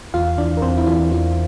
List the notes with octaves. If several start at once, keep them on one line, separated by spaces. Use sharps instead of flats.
E2 F4 F5
E3 D4 D5
A#4
E2 C4 C5
E4
E3 F4
E2 F4